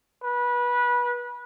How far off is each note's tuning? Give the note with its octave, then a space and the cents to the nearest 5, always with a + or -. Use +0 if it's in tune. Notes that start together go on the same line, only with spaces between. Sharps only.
B4 -25